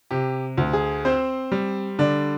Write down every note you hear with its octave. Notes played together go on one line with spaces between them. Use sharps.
C3 G4
D2
G#4
C4 C5
G3
D3 D5